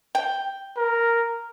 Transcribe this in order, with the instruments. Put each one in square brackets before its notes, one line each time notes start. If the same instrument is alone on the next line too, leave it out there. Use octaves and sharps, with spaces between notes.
[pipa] G5
[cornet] A#4